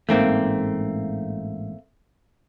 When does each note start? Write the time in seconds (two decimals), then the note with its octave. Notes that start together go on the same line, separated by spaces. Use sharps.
0.09 A1 G#2 A3 A#3 C4